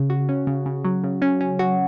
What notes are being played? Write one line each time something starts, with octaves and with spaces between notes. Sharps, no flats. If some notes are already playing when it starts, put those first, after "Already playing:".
Already playing: C#3
F#4
C#4
C#3
C#3
F#3
C#3
C#4
C#4
F#4